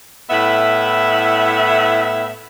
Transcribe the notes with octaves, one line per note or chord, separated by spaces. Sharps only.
A2 B3 E4 E5